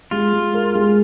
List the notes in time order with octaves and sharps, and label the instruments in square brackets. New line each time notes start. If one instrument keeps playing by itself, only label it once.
[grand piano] G#3 [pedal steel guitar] F4
[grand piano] G#3
A#4
G#3